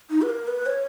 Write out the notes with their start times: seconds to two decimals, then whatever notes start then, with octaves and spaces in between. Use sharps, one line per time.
0.10 D#4
0.22 B4
0.29 A#4
0.47 B4
0.66 C#5